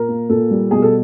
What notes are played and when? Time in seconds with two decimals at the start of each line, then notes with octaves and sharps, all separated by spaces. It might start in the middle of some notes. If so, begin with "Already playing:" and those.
Already playing: A#2 A#4
0.09 A#3
0.29 A#2 A4
0.51 G3
0.71 B2 G#4
0.82 A4